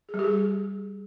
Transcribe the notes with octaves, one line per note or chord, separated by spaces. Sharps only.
G#4
G3
G4
G#4